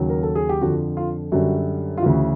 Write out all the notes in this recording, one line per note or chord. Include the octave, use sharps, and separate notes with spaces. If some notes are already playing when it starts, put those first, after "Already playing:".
Already playing: D#2 C#3 F#3
A#4
A4
G#4
G4
F2 D3 F3 F#4
F4
F#2 D3 G3 F#4
F4
D2 C#3 E3 F#4